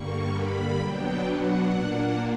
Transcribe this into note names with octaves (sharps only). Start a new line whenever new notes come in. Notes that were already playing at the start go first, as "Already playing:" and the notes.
Already playing: G2 D3 G3 A#3 C#6
B5
B2 F#3 B3 D4 G5
F#5
A#2 A#3 D4